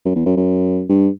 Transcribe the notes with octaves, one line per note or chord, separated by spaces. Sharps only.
F#2
E2
F#2
F#2
G2